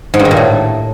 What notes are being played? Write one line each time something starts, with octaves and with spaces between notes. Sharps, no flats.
G#2
G2
D#3
A#2
A2